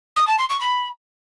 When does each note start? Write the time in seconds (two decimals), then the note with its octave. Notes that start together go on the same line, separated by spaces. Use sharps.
0.16 D#6
0.27 A5
0.38 C6
0.49 C#6
0.60 B5